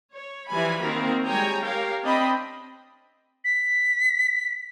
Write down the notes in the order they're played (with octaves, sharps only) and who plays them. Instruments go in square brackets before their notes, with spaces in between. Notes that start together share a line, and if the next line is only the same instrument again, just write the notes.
[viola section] C#5
E3 F3 G3 E4 G#5 B5
D#3 A#3 C4 F#4 A#4
G3 G#3 C#5 G5 G#5 A#5
G4 A#4 C#5 F5 G5
C4 D4 D#5 G5 B5
[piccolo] B6